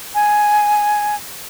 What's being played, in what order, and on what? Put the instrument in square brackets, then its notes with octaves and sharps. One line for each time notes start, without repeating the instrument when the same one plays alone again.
[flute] G#5